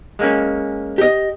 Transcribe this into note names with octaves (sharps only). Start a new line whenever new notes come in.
G#3 A#3 C#4
G4 D#5